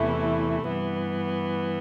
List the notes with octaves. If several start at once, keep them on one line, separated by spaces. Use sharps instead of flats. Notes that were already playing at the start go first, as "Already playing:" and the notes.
Already playing: E2 C3 E3 A3 E4
G2 E3 B3